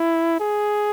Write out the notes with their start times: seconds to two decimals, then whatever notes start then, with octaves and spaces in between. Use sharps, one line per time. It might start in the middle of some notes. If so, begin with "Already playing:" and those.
Already playing: E4
0.40 G#4